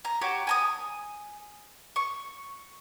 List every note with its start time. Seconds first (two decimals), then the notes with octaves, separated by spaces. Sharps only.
0.05 A#5
0.21 F#4 G4 C#5 G5
0.47 G#5 A#5 D#6
1.96 C#6